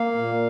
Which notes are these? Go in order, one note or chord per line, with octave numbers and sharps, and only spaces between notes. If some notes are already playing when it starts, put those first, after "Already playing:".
Already playing: A#3 F5
A#2